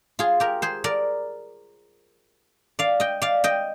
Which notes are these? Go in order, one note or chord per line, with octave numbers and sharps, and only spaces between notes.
F4 G#4
G4 A#4
G#4 C5
A#4 D5
D5 F5
D#5 G5
D5 F5
D#5 G5